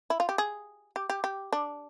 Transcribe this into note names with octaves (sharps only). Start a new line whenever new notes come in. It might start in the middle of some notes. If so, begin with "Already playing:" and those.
E4
F4
G4
G#4
G4
G4
G4
D4